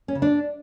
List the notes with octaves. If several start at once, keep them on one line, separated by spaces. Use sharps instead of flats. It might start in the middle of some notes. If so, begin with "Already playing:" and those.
C#4
C#3
D4